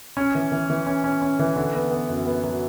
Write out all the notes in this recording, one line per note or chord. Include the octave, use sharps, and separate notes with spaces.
C#4
E3
E3
E3
C#4
C#4
C#4
E3
D3
B3
B3
F#2
B3
F#3